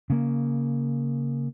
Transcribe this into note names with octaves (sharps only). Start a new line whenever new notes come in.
C#3 A#3